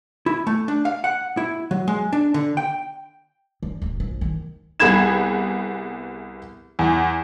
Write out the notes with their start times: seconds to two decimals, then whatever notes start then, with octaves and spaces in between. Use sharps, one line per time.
0.26 E4
0.47 A3
0.68 D4
0.85 F5
1.04 F#5
1.37 E4
1.71 F#3
1.88 G#3
2.13 D4
2.34 D3
2.57 G5
3.63 D3
3.82 D1
4.00 A#1
4.21 D#3
4.80 C2 B3 G#4 B5 G#6 E7
6.79 E2